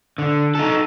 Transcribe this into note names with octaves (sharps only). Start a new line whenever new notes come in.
D3
D#4 A4